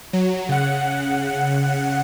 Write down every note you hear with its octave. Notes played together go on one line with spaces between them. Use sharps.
F#3
C#3 F#5